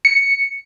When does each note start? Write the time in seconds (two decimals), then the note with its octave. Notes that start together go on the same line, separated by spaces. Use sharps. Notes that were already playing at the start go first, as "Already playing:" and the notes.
0.05 C#7